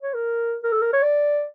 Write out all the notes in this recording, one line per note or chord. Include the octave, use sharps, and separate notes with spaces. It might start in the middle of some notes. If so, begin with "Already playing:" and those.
C#5
A#4
A#4
A4
A#4
C#5
D5